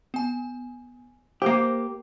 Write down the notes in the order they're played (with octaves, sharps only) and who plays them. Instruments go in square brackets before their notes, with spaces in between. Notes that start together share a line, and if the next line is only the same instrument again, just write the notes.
[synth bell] B3 G#5
[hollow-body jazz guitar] A#3 G4 [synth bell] C5